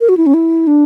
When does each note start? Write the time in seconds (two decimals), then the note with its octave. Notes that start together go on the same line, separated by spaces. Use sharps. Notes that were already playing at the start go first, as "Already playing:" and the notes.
0.01 A#4
0.09 F#4
0.17 E4
0.26 C#4
0.34 E4
0.67 D4